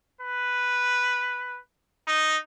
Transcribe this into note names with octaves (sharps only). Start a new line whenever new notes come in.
B4
D#4